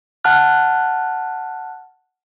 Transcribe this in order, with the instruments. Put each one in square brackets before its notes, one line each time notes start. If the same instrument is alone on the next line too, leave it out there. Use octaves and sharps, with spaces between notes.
[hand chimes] F#5 A5 F6 F#6